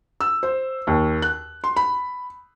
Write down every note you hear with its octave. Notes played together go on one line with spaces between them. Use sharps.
E6
C5
D#2
F#6
C6
B5